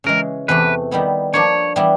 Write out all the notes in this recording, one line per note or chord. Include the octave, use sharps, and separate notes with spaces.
C#3 E3 G#3 A#4
E2 C3 E3 A3 B4
D#3 G3 B3 E4
F3 A#3 D4 C#5
E3 G3 B3 E4